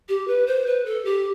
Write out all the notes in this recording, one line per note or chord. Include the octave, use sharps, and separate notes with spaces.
G4
B4
C5
B4
A4
G4